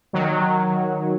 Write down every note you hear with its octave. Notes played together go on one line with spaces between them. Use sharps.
D#3 F#3